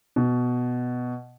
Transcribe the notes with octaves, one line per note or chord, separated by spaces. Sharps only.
B2